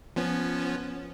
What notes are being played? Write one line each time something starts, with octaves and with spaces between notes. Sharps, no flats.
F3 B3 C#4